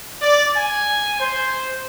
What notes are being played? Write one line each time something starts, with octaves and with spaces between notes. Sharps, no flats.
D5
G#5
C5